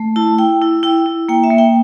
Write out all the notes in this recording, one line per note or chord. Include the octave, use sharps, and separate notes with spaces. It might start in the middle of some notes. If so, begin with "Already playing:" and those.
Already playing: A3
E4 A5
E4 G5
E4
E4 G5
E4
A#3 G5
E5
A#3
G5